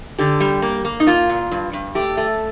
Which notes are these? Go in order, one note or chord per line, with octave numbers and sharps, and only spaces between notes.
D3 G4
G3
A#3
A#3
D#4
A#3 F4
A#2
G2
G2
A3 G4
A3